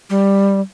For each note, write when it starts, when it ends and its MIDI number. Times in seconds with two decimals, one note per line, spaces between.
0.10 0.61 55